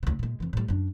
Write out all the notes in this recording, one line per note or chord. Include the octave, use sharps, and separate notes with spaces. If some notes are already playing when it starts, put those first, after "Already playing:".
D2 C#3
A#2 G#3
F2 E3
A2 G3
F#2 D4